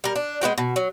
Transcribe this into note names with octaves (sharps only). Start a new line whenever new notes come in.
G3 A#4
D4
G#3 B3 F#4 G5
B2
F#3